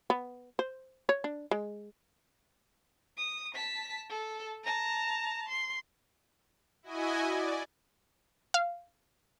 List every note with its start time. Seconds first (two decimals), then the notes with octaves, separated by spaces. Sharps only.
0.10 B3
0.59 C5
1.09 C#5
1.24 D4
1.51 G#3
3.17 D#6
3.55 A5 B6
4.10 A4
4.64 A5 A#5
5.49 C6
6.83 E4 F#4 D#5 G#5
7.29 D5
8.54 F5